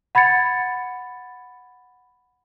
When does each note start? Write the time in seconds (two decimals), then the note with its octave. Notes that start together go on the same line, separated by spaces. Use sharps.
0.15 F#5 B5 G#6 A6 C#7